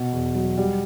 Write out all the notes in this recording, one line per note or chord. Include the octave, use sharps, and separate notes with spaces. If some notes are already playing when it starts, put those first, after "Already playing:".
Already playing: B2
E2
F#3
G3